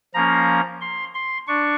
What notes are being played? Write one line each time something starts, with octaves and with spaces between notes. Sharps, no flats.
F3 A#3 C#4 A#5
C6
C6
D4 C#6